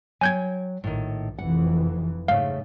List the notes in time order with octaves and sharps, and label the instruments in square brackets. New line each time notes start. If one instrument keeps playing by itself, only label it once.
[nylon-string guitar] F#3 G5 [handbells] G#5 G6 G#6
[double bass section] A#1 [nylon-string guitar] A2 D#3
[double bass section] F1 F2 E3 [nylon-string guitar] F#5
[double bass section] G#2 [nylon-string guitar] C#3 A3 [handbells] F5